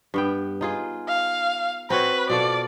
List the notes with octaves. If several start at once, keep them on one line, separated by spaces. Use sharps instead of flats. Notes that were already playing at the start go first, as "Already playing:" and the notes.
G2 B3 G5
D#4 F4 G#4
F5
C4 F#4 B4 C#5
B2 F4 A4 D5